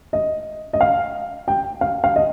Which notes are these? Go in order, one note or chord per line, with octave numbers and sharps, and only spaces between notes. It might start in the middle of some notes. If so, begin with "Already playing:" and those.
D#5
D#5
F5
G5
F5
F5
D#5